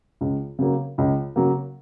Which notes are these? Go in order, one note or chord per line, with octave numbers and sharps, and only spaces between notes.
C#2
C#3 F#3 A#3
C#2
C#3 F#3 A#3